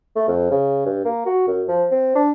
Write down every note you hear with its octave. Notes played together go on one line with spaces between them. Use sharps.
A3
F2
C#3
G2
A#3
F#4
F#2
F3
C4
D4